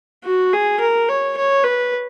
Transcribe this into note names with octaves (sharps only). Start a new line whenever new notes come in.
F#4
G#4
A#4
C#5
C#5
B4